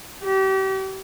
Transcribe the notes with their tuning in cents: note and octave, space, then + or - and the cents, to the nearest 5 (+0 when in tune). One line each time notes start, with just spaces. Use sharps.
G4 -35